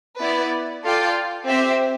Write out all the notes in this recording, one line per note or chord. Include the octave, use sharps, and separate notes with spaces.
B3 E4 B4 D5
F4 A4 D5 G5
C4 G4 C5 E5